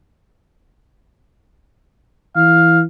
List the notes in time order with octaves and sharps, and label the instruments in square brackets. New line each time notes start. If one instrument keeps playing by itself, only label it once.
[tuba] E3 [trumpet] F5